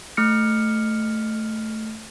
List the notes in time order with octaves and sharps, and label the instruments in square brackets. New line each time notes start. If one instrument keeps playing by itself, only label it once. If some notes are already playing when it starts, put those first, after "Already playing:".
[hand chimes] A3 F6 C#7